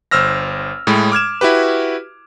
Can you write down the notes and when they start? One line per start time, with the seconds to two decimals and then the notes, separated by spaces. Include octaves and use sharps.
0.11 G1 C5 E6 F6 A#6
0.87 A2 G#3 B5
1.12 D6 F6 G#6 E7
1.41 E4 F#4 G4 B4